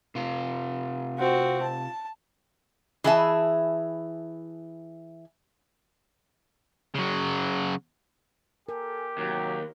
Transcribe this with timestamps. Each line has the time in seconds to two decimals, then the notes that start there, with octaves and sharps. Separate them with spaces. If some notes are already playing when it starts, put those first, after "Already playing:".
0.15 C3 F4
1.18 C4 F#4
1.62 A5
3.04 E3 G#4 E5 A5
6.95 C#3 F#3
8.69 G4 A4 A#4 G#5
9.18 D#2 C3 F#3